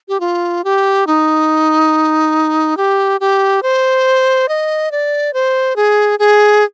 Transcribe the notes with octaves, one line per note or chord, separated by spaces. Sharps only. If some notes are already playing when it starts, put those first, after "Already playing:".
G4
F4
G4
D#4
G4
G4
C5
D#5
D5
C5
G#4
G#4